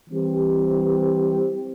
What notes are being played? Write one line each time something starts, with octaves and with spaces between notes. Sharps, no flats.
E3 G3 C4 G4